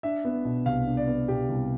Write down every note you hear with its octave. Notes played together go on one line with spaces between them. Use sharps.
D4 E5
B3
B2
C2 F5
D4
D5
B3
B2 G4
C2